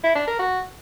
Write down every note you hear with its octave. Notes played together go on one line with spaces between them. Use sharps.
E4
D4
A#4
F#4